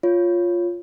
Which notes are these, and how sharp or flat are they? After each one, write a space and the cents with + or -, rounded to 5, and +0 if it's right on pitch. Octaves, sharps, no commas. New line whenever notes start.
F4 +0 C#5 +0